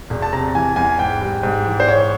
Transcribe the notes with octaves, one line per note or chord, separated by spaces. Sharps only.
E1
A5
C3 A#5
E3 G#5
E2 G#5
G#2 G5
G3
G#2
E3
C5
G#2 C#5